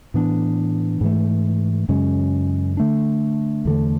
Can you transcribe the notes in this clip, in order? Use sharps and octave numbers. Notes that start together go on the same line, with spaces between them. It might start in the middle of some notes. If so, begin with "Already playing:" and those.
A2 E3 B3 D4
G#2 E3 A3
F#2 C#3 G#3 C#4
D3 A3 D4
E2 D3 A3